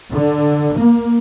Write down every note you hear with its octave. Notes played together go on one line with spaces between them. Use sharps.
D3
A#3